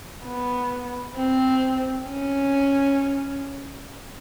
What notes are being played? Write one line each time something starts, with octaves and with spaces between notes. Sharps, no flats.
B3
C4
C#4